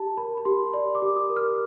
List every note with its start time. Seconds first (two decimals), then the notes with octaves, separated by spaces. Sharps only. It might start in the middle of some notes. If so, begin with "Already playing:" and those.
Already playing: G4 A5
0.17 A#4 B5
0.37 B5
0.45 G4 C6
0.73 D5 C6
0.95 D6
1.02 G4
1.16 D#6
1.30 A#4
1.36 F6